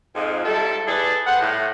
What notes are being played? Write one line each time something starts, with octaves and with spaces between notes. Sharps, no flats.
F2 G#2
G#2 G3 E4 A4
E4 G#4 A4 B4 D5 D#5
G3 B4 C5 F#5
A2